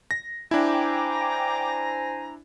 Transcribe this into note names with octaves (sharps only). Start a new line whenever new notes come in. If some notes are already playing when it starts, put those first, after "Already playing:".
A#6
D4 E4 C5 G5 G#5 A#5 D6